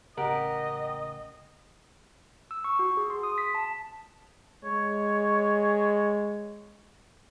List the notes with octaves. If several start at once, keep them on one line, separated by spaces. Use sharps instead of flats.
A1 C#3 G4 A#4 D#5 F#5 G5
E6
C#6
F#4
G#4
C6
D#6
B6
A5
G#3 C#5